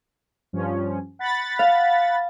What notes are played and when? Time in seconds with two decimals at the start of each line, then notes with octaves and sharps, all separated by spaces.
0.53 G2 F3 C#4
1.19 F#5 B5 A6
1.59 F5